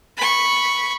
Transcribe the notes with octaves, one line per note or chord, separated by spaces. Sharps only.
B5 C#6